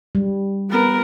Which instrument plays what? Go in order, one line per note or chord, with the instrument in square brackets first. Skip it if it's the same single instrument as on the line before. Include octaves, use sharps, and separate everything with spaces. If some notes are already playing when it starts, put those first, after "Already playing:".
[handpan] G3
[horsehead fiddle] B3 A#4